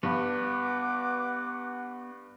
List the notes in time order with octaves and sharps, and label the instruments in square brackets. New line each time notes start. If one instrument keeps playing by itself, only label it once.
[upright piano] G2 [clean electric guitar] B3 [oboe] F#5 [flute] D6